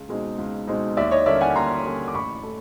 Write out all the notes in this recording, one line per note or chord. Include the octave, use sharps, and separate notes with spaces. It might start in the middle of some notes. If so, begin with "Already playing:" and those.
Already playing: C#2
B2 G#3 C4 D#4
C#2
B2 G#3 C4 D#4
D#2 D5 E5
C#5 D#5
D3 G3 A#3 C#4 D5 E5
F#5 G#5
D#2 A#5 C6
D3 G3 A#3 C#4
D6
A1 B5 C#6
A3